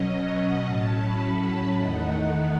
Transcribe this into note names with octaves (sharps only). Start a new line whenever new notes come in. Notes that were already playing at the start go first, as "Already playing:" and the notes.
Already playing: B2 F#3 C#4 D#5
F#5
A2 F#3 C#4 A5
B5
A5
E2 D#3 A3 D#4 F#5